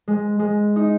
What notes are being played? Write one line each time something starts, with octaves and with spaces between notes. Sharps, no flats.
G#3
G#3
D#4